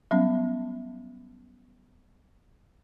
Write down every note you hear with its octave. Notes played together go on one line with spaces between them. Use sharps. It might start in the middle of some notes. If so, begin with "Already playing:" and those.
F#3 G3 B3 C#4